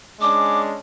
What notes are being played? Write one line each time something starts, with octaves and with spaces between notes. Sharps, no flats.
G#3 C#4 D4 D6